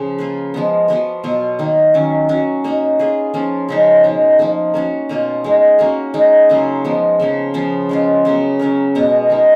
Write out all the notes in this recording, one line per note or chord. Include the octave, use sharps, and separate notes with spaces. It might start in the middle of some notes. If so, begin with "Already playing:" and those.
Already playing: C#3 F3 C#4 G#4
A#3 F4 B4
F3 G#3 B3
F3 B3 F#4 B4
B2 F#3 B3 F4
D#3 A#3 D#4
D#3 F#3 C#4
F#3 C#4 F#4
A#3 D#4 F#4
A#3 F4 G#4 B4
F3 A#3 C#4 F4
C#3 F3 G#3 D#4
B2 G#3 D#4
F3 A#3 D#4
A#3 C#4 F#4
B2 A#3 F4
G#3 D#4 A#4
A#3 C#4 F#4 A#4
G#3 D#4 A#4
C#3 F#3 A#3 F4
F3 G#3 B3
C#3 F3 A#3
C#3 F3 B3 F4
G#3 C#4 F4
C#3 F#3 B3
F#3 C#4 F#4 A#4
B2 G#3 B3
G#3 D#4 A#4